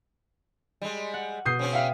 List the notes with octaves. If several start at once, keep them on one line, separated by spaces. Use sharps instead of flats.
G3 G#3
F#5
B2 D#6 G6 C7
C#3 C4 C#4
E5 F5 G5